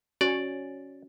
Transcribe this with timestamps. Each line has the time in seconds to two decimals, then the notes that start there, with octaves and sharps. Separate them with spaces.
0.21 C#4 F#4 C#5 D5